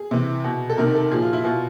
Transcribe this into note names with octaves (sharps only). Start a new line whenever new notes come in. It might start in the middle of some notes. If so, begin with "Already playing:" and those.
Already playing: G#4
C3 E3
B2
A4
C3 D#3 A#4
A4
A#2 F3 G#4
F4
E4
B2 F4